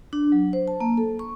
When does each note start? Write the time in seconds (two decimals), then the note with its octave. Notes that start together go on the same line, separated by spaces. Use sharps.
0.13 D4
0.32 F#3
0.53 C5
0.68 A5
0.80 A#3
0.97 A4
1.19 C#6